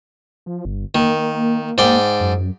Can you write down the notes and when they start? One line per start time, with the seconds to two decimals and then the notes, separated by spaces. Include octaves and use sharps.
0.46 F3
0.65 G1
0.95 D#3 A#3
1.78 G#2 D5 G5
2.21 F#2